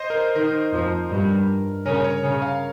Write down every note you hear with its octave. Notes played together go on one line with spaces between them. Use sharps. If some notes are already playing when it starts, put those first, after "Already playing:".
Already playing: C5 D#5
A#4
D#3 A#4
F2 F3
G2 G3
C#3 C#4 A#4
C#5
C#3 C#4
F5